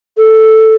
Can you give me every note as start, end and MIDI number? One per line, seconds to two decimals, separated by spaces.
0.17 0.75 69